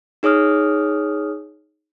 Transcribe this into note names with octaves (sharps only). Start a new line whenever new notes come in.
D#4 G#4 C#5 D#6 F6